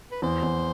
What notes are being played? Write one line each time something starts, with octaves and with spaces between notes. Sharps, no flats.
B4
E2 C5
E2